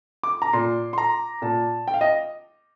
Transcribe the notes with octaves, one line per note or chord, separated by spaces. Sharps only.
D6
A#5
A#2 C6
C6
A#5
A#2 A5
G5
F5
D#5